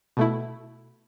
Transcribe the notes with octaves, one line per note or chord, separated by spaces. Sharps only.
B2 A3 E4